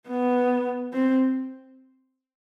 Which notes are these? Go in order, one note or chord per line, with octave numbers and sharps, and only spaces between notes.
B3
C4